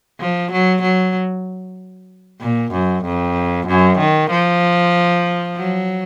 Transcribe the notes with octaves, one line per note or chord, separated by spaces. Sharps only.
F3
F#3
F#3
A#2
F#2
F2
F#2
D#3
F3
F#3